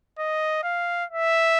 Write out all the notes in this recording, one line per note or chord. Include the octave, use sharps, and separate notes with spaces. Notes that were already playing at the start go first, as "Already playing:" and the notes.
D#5
F5
E5